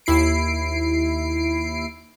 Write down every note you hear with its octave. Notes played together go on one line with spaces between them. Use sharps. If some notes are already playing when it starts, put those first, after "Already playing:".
D#2 E4 C7 D7